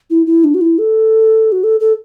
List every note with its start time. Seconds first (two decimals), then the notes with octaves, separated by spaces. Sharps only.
0.10 E4
0.27 E4
0.44 D4
0.54 F#4
0.61 E4
0.78 A4
1.52 F#4
1.64 A4
1.80 A4